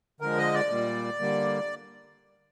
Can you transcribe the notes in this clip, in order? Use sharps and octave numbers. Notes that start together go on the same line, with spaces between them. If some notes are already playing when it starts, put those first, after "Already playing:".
D3 F3 G#3 A#4
D#5
D5
A#2 G3 A#3
D3 G3 A#3